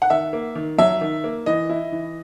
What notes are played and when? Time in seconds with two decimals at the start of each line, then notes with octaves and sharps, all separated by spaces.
0.02 F#5
0.10 D#3 E5
0.33 A#3
0.55 D#3
0.78 F#3 E5
1.01 D#3
1.24 A#3
1.46 E3 D#5
1.69 E4
1.92 E3